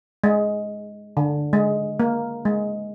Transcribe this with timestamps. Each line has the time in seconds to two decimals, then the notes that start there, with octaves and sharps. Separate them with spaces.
0.24 G#3
1.17 D3
1.53 G#3
2.00 A#3
2.45 G#3